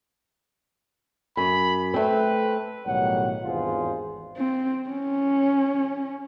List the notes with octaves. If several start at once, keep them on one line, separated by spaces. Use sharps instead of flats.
F#2 B5
A3 C4 B4
B1 A2 D#3 G3 C#5 F#5
G#1 E2 G2 F4 G#4 C5
C4
C#4